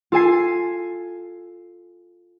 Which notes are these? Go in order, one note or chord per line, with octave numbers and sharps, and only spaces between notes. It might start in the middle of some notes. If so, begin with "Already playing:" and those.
F4 A4 G#5 C7